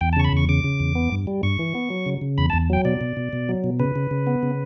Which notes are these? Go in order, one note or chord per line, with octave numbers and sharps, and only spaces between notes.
E2 G5
A5
C#3 C#6
B5
E2 C#6
C#3 D6
C#3
E2
B3
G2
G3
G2 C#6
E3
B3
F#3
C#3
C#3
E2 B5
A5
E2
F#3 G5
B2 D5
B2
B2
B2
F#3
B2
C#3 B4
C#3
C#3
B3
C#3